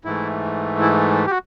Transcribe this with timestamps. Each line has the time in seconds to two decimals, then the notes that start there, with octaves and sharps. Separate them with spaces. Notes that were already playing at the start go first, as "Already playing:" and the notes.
0.05 G#2 E3 A3 E4
0.81 E4
1.27 G4
1.31 F#4